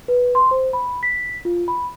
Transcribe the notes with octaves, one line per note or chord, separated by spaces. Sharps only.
B4
C6
C5
B5
B6
F4
B5